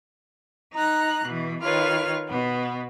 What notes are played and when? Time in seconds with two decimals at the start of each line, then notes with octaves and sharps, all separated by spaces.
0.73 D#4 A#5 F#6
1.25 B2 E3
1.62 D#3 F4 B4 C#5 F6
2.28 B2 B3